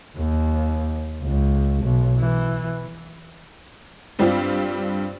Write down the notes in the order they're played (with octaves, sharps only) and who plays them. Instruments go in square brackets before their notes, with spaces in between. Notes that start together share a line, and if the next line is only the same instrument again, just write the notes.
[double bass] D#2
C#2
B1
E3
[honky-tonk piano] G2 G3 C4 D4 F4